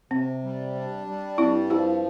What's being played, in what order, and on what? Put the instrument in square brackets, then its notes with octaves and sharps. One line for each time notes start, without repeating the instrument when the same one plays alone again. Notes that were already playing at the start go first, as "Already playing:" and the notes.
[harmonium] C3 [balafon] C4
[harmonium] G3
D4
G3
[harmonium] G2 [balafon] C4 E4
[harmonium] F3 [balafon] E4 G4